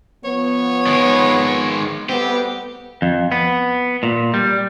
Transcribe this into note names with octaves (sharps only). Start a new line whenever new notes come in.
F3 B3 C#5
D#3 G#3
G3 A3 B3 C4 G4
F2
B3
A#2
G3